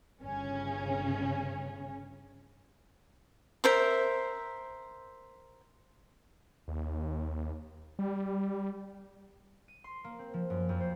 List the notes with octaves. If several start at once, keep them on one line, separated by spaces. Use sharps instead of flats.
G1 C#3 C#4
A#4 C5 E5
D#2
G3
D#7
C6
A#3
C4
F3
F#2
F2
C5